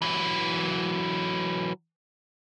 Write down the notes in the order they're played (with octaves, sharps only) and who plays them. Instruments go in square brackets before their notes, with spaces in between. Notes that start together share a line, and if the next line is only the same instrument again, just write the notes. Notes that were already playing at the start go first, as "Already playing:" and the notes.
[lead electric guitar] E3 F#3